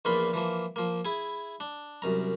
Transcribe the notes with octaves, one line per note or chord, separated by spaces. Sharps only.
A#1 E2 A#2 A#3 F4 B5
E3 F3 A#3
F3 A#3
E4 G#4
D4
C2 F#2 A#5